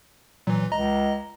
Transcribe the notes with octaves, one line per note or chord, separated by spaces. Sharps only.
A#2 E3 F#3
C#2 D#5 A#5